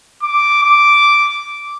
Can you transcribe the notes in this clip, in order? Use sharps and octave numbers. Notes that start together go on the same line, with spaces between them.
D6
D6